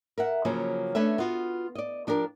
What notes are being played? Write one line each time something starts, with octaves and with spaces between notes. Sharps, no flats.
A#4 E5 F#5
C#3 F3 F#3 A#3 C#4
A3 C#4 D4 B4 E5
B3 F4 F#4
D5 D#5
F3 D4 G4 A#4